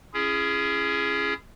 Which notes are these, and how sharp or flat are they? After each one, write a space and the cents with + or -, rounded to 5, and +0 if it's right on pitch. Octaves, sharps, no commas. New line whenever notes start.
C#4 +0 E4 +40 G#4 +0